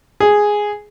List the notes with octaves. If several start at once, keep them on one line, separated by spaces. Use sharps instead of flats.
G#4